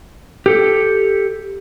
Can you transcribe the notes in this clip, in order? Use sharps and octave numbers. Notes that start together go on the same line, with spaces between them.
G4 A4